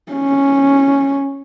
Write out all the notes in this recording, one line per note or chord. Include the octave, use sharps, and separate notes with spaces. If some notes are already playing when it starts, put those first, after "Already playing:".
C#4